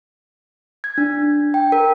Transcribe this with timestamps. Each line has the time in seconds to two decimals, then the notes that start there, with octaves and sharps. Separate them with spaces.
0.84 G#6
0.98 D4
1.54 G5
1.72 A#4